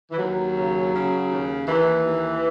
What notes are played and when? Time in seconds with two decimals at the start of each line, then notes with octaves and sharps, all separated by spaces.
0.11 E3
0.18 D#2 F#3
0.56 C#3
0.93 C#3
1.30 D#2
1.67 D#2 E3
2.06 D#2